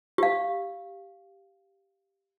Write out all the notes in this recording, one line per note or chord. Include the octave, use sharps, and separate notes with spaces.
G4 F5